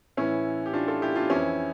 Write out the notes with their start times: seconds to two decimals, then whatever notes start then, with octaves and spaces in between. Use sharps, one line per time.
0.17 A2 E3 C#4 E4
0.66 G4
0.73 D4 F4
0.88 F4 A4
1.02 E4 G4
1.15 D4 F4
1.30 F2 E3 C#4 E4